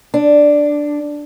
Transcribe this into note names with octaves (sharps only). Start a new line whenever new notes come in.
D4